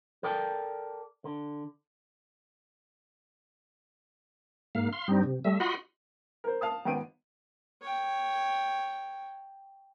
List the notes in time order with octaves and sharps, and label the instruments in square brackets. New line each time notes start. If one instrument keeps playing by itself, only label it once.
[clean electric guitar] A4 A#4 D5 G5 A5
D3
[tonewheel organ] G#2 A#3 F5
F5 C6
G2 G3 C4 D#4
C3
G3 A3 E5
F4 F#4 D#5 F#5 B5 C6
[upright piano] A#4 C5
F5 A5 D#6
G#1 B3 G5 D7 D#7
[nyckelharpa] C#5 G5